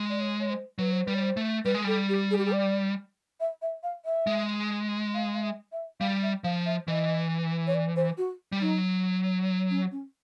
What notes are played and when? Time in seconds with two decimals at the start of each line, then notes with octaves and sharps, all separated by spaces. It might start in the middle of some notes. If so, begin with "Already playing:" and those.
Already playing: G#3
0.10 D5
0.20 C#5
0.40 C#5
0.50 C5
0.79 F#3 B4
0.92 C5
1.07 G3 B4
1.15 C#5
1.22 C5
1.37 A3
1.65 G3 B4
1.75 G#3
1.84 G3 A4
2.09 G4
2.31 G#4
2.38 G4
2.45 G#4
2.52 D5
3.40 E5
3.62 E5
3.83 F5
4.05 E5
4.27 G#3
5.14 F5
5.34 F5
5.42 E5
5.72 E5
6.00 G3 F5
6.23 E5
6.44 F3 F5
6.66 E5
6.88 E3 D#5
7.67 C#5
7.75 D5
7.96 C5
8.18 F#4
8.52 G3
8.61 F#3 D#4
9.70 C#4
9.92 C#4